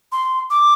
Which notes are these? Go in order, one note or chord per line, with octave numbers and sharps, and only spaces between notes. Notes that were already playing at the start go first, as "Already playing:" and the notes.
C6
D6